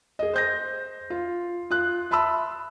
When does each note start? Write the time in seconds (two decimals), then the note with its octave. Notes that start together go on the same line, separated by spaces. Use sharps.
0.19 G#4 D#5
0.34 C5 G6 A#6
1.10 F4
1.70 F4 F#6
2.11 E5 A5 B5 C6 E6